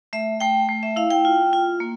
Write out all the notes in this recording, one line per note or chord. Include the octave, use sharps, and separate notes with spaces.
A3 E5
A3 G5
A3
E5
E4 F5
G5
F4
F4
A#3